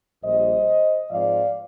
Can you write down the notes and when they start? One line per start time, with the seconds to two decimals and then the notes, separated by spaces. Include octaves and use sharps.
0.22 A#1 A#2 G3 C5 D#5
1.09 G#2 F3 G#3 C4 D5 F5